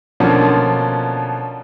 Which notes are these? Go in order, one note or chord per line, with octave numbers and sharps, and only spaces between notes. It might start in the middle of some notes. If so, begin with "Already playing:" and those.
B2 D3 F3 A#3 C#4